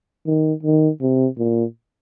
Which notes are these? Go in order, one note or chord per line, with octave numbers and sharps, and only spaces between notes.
D#3
D#3
C3
A#2